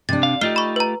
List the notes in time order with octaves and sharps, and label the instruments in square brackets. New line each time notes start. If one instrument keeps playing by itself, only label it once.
[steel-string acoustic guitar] C3 D4 [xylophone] A6
[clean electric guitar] F5
[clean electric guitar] A3 F4 G4 [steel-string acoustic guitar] D#4 [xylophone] F6 C7 G7
[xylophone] B5 C#6
B4 A#5